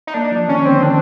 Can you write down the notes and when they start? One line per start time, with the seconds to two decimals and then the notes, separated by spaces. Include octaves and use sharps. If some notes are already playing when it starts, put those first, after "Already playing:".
0.07 D#4
0.14 A#3 D4
0.32 F3
0.48 D#3 C#4
0.65 D3 C4
0.83 D#3 D4